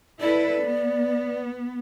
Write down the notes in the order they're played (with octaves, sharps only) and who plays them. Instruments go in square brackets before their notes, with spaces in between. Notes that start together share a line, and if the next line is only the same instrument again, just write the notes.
[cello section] E4 A4 B4 [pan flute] D5
[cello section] B3